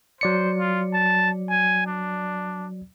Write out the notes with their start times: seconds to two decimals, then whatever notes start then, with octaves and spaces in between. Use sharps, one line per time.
0.21 F#3 C5 D5 C#7
0.59 F4
0.94 A5
1.50 G#5
1.87 D4